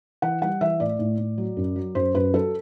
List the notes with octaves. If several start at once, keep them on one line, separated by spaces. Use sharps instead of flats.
E3 F#5
G3 F#5
E3 E5
A2 D5
A2
A2
F#3
F#2
F#3
F#2 C5
F#2 B4
F#3 A4